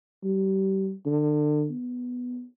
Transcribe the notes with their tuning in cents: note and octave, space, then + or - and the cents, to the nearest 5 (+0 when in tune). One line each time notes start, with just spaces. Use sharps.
G3 -30
D3 +30
B3 +0